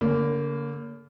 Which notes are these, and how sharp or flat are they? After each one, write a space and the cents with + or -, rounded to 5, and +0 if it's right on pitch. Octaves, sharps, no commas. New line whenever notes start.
D3 -45 A#3 -5 C#5 +25